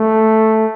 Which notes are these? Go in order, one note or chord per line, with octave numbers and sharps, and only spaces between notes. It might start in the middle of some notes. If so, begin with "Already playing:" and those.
Already playing: A3